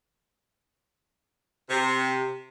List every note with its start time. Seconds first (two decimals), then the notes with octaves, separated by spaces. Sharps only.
1.70 C3